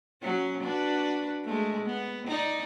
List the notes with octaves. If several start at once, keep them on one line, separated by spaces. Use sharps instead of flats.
F#3 C#4
D4 F#4 B4
G#3 A3
B3
D#4 D5